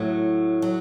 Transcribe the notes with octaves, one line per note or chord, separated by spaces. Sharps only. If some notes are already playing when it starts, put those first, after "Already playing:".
Already playing: A2 F#3
F#3